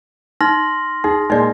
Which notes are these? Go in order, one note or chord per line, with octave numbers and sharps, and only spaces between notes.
D#4 C6 F6 A#6
D#4 G#4
A#2 G#3 D#4 D5